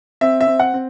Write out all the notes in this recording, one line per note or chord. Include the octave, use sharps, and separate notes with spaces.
C4 E5
E5
C4
F#5
C4